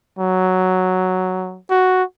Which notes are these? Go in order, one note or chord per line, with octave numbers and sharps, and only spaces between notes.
F#3
F#4